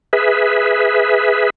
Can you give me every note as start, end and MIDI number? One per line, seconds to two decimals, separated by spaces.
0.13 1.50 68
0.13 1.50 71
0.13 1.50 76